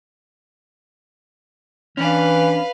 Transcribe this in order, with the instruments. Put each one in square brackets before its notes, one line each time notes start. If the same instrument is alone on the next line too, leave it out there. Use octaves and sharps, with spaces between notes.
[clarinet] E3 [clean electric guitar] C#4 D4 [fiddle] B4 F5